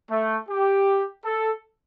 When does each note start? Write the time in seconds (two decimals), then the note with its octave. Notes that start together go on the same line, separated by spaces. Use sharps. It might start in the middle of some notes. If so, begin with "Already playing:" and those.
0.10 A3
0.49 G4
1.24 A4